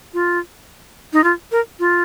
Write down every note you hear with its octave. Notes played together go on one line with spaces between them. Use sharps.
F4
D#4
F4
A#4
F4